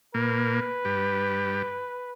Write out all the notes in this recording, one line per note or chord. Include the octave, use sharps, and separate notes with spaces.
A#2 A#3 B4
G2 G4